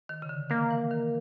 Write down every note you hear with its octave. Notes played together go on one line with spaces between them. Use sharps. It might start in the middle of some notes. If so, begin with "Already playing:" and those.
D#3
C#3
D3
D#3 A#3
E3
D#3